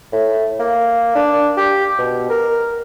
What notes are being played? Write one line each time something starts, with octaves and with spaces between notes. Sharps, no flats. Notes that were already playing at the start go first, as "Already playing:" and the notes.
A2
A#3
D4
G4
B2
A#4